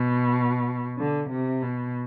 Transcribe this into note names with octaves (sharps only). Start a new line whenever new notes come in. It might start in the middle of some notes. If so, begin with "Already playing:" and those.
Already playing: B2
D3
C3
B2